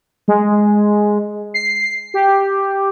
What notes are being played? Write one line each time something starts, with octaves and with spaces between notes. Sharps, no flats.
G#3
C7
G4